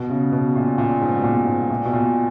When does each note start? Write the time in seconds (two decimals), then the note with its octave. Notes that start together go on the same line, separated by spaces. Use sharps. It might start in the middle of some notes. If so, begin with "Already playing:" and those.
Already playing: B2
0.10 C#3
0.32 B2
0.56 A#2
0.78 A#2
1.01 G#2
1.18 B2
1.24 A#2
1.47 G#2
1.71 A#2
1.85 B2
1.93 A#2